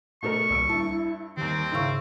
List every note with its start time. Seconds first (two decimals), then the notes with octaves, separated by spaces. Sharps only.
0.22 B2 A3 A#4 C#6
0.50 D#1 C2 E6 D7
0.69 G2 E4 A5
1.37 D#2 D#3 G3 C4
1.72 G#2 C#3 E4 F5 C#6 E6